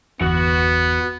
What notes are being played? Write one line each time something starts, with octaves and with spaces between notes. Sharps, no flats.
G1 E2 B3 F#4 F#5